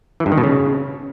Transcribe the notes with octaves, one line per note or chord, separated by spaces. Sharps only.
E3
G2
D#3
B2
C#3